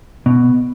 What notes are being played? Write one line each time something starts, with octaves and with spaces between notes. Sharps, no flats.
B2